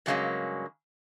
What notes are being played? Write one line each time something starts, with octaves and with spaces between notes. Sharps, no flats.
G2 C#3 F#3 G#3 A#3 C#4